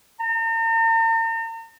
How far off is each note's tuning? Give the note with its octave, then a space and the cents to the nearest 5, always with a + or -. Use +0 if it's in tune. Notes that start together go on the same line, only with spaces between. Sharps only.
A#5 -45